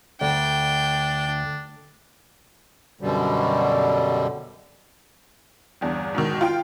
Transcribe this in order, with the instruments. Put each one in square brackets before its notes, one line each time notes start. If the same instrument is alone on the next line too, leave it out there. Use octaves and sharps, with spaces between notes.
[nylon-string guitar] D2 [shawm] D4 [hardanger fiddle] G5
[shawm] D4
[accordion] F#2 B2 D3 G3
[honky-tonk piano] G1 E2 D4
G#2 B2 D#3
F4 G5